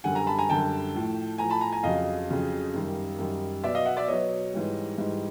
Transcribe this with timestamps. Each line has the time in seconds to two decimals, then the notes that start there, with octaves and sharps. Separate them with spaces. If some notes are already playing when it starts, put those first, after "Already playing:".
0.04 F#2 D3 G3 F#5 G#5
0.15 G#5 A#5
0.27 A5 B5
0.39 G#5 A#5
0.49 F#2 D3 G3 G5 A5
0.94 A2 F3
1.38 A2 F3 G#5 A#5
1.50 A5 B5
1.61 G#5 A#5
1.72 G#5 A#5
1.83 F2 C#3 F#3 D#5 F5
2.28 F2 C#3 F#3
2.74 F#2 D#3 G3
3.18 F#2 D#3 G3
3.63 B2 F#3 D5 E5
3.74 D#5 F5
3.85 E5 F#5
3.97 D5 E5
4.08 B2 F#3 C#5 D#5
4.53 G#2 E3 G3
4.98 G#2 E3 G3